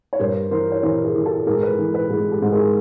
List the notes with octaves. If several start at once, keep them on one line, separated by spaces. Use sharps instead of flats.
C#5
G2 A#4 C5
E3 A#4 C5
C#5
E3 A#4 C5
G#4 A#4
E3
G4 A4
G#2 G#4 A#4
A4 B4
E3
A4 B4
G#2 G#4
G4 A4
G#2
G#4 A#4